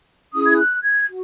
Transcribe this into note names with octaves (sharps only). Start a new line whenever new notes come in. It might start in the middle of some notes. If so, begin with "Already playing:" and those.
C#4 E4 G#4 D#6
G#6
F#6
G#6
F#4